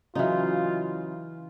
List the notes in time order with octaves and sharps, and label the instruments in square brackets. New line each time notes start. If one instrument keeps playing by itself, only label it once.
[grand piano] C#3 F#3 [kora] E3 D#4 [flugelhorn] F4